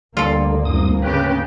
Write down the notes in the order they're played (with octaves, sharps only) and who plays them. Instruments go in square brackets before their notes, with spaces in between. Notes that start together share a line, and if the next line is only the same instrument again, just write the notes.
[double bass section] D2 A#3 [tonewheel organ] D3 G3 [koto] F4 A4
[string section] C2 [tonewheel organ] F#2 D#6
[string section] G#2 C#3 G4 [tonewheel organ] C#4 B4